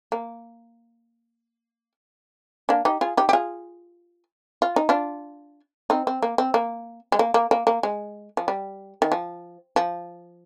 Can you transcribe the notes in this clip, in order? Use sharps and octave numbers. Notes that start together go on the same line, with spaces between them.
A#3
A#3 D4
D#4 G4
F4 G#4
D#4 G4
G4
F4 G#4
F4
D#4
D4 F4
C4 D#4
C4
A#3
C4
A#3
G#3
A#3
A#3
A#3
A#3
G#3
F3
G3
D#3
F3
F3